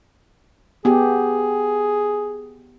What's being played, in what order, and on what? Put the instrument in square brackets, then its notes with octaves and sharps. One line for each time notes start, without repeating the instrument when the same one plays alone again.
[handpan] B3 G4 [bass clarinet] G#4